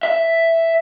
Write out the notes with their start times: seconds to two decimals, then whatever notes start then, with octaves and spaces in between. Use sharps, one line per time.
0.03 E5